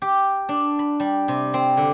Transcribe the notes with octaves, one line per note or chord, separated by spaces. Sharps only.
G4
D4
B5
G3
C3
C4
D3